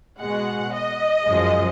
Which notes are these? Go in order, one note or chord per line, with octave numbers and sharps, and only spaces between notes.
B2 G#3 F#5
D#5
F#2 F3 G#3